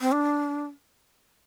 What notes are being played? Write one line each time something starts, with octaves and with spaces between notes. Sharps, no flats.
C4
D4